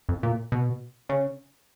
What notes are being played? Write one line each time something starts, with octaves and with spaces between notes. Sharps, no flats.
F2
A#2
B2
C#3